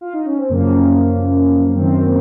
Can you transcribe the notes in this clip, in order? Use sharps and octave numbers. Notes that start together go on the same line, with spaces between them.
F4
D#4
C#4
C4
F#2 C#3 F3 A#3
F#2 D#3 C4
A#3